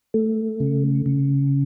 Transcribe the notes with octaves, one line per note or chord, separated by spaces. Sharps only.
A3
C#3
C#3